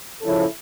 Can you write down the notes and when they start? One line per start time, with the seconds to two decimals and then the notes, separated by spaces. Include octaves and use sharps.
0.22 C#3 F3 C#4 E4 A4